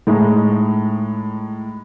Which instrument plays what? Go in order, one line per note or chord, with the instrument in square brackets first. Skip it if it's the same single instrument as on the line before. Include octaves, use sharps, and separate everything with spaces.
[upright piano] A2 G#3 D#4